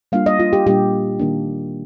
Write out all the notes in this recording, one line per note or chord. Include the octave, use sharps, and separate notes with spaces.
G3 A#3 D4 F4 F5
D#5
F4
G4
A#2 G3 A#3 D4 F4 G4
D#3 A#3 D4